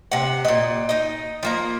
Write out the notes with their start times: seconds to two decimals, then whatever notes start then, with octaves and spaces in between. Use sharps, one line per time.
0.12 C3 F#5
0.45 A#2 D#5
0.89 D#4 D#5
1.43 F3 A#3 A#5